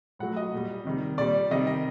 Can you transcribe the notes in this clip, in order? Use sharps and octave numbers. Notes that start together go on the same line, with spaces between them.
A2 F#3 F#5
D#5
A#2 G3
C3 D#3 G3
A#2 G3 D5
C3 D#3 G3 D#5
D#5